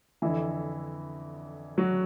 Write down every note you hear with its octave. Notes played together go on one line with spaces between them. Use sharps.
F2 D3 E3 E4
F#3 F#4